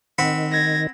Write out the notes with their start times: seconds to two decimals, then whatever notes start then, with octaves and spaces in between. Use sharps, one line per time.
0.18 D#3 C4 F#5 B5
0.51 G#6 A#6